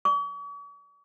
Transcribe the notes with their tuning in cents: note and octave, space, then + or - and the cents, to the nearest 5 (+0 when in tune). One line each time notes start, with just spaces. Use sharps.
C#6 +45